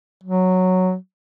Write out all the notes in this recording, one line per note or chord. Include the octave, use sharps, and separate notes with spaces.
F#3